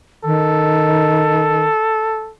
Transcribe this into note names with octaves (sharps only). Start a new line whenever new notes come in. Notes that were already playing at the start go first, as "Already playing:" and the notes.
D#3 A4